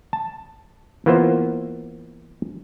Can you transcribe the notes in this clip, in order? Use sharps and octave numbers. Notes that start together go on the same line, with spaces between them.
A5
E3 A#3 B3 F4 C5